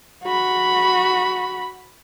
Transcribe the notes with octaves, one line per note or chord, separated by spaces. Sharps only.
F#4 B5